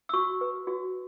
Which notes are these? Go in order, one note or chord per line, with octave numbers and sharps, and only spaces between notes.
E6
F#4 C#6
B4
F#4